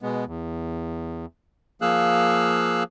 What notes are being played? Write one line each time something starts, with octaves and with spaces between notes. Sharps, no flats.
B2 G#3 B3
E2
F3 A#3 G#4 F5 E6 F#6